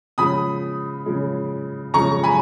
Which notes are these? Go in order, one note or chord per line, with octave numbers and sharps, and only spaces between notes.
C#3 F3 G#3 B5 D#6
C#3 F3 G#3
C#3 F3 G#3 A#5 C#6
G#5 B5